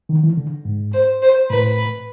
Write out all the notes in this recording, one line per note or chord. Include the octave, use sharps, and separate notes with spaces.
D#3
E3
D3
G#2
C5
C5
A2 B4